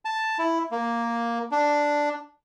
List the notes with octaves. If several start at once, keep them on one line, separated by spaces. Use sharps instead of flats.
A5
E4
A#3
D4